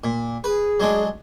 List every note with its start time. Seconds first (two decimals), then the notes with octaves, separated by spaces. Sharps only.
0.04 A#2
0.44 G#4 B4
0.80 F#3 G#3 D4